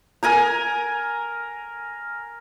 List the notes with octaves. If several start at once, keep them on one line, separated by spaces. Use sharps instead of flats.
A#4 G#5 A#5